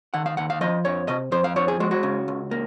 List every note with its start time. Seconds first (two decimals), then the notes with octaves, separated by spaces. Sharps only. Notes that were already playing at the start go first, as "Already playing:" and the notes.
0.14 D#3 F#5
0.26 F5
0.37 D#2 F#5
0.50 F5
0.61 F3 D#5
0.85 F2 C#5
1.08 C3 D#5
1.32 F2 C5
1.44 F5
1.56 F3 C#5
1.68 G#4
1.80 G#3 F#4
1.91 F#4
2.03 C#3
2.28 C#2
2.51 A#3